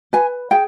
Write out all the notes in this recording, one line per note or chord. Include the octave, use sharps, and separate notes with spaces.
B4 G#5
G#4 G5